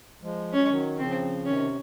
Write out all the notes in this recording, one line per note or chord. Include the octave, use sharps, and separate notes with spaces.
F3 G#3
F#3 C#4
G#3
D#3 F#3
C#3 F3 C4
C3 D#3 C#4